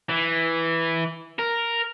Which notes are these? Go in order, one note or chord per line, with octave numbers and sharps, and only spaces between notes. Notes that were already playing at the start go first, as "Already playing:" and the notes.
E3
A#4